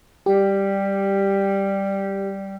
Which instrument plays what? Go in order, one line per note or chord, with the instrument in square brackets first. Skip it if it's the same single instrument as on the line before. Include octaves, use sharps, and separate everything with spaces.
[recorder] G3 [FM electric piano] G4